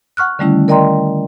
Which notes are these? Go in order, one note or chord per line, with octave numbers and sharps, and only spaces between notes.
F#5 C#6 F6 F#6
D3 D#3 G3 A3 C#4 E4
A#4 D5 D#5 G5 A#5 C6